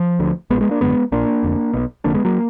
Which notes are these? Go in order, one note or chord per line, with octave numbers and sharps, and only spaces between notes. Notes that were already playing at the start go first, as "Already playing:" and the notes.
Already playing: F3
D2 D3
A#1 A#2 G#3 B3
G#3 B3
A#3 D4
G#1 F#2 D3 G#3 B3
A#1 A#2 A#3 D4
F1 F2 D3
B1 B2
F1 F2 D3 A#3 D4
G#3 B3
F#3 A#3